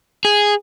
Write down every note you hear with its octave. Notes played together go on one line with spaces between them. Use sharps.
G#4